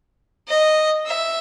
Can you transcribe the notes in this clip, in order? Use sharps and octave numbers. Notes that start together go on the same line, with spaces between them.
D#5
E5